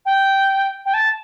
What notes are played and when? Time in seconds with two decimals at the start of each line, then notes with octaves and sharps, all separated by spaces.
0.05 G5
0.85 G5
0.93 A5